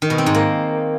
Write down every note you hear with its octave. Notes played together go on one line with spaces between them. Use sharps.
D#3
B2
C4
G#2
A#3